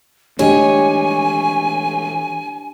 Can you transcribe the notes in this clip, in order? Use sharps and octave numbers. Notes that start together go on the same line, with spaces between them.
E3 G#3 A3 D4 G4 C#5 D#5 G#5